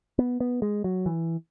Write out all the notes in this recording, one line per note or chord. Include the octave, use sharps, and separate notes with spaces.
B3
B3
G#3
F#3
E3